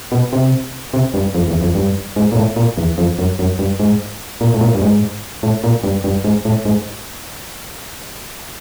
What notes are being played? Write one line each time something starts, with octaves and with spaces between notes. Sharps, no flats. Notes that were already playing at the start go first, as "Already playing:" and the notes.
B2
C3
C3
G2
F2
E2
F2
G2
G#2
A#2
A2
A#2
E2
F2
F#2
F#2
G2
G#2
A#2
A2
A#2
G2
G#2
A2
A#2
G2
G2
G#2
A2
G#2